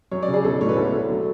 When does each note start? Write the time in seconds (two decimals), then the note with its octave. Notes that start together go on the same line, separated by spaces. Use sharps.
0.12 F#2 C#5
0.23 D5
0.28 C#3
0.33 G#4
0.44 B1 A4
0.61 A2 C#5
0.69 B4
0.77 D2 A4
0.93 D3
1.09 F#3